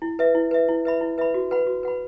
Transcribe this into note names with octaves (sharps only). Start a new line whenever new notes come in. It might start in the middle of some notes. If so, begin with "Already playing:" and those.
E4
B4 E5
E4
B4 E5
E4
B4 E5 B5
E4
B4 E5 B5
F#4
B4 F#5 B5
F#4
B4 F#5 B5